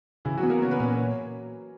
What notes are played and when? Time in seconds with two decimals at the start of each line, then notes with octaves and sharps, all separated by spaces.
0.25 C#3 E3 E4
0.38 F#3 F#4
0.43 B3
0.50 A#3 A#4
0.62 B3 C#4 C#5
0.71 B4
0.80 A#2 C#4 C#5
0.94 C#5